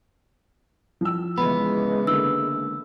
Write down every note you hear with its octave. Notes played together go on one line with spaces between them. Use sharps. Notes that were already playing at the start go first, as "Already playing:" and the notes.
F3 E6
C#3 E3 G#3 B3 B5
D3 A#3 E6